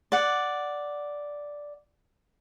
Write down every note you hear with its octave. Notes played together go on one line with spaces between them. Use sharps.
D5 F#5